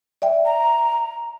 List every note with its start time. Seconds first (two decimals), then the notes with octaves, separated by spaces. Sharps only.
0.22 D5 E5 G5
0.45 A#5